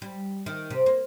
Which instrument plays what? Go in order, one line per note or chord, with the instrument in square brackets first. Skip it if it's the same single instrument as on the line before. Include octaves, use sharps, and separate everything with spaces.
[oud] G3
D#3
C3
A#3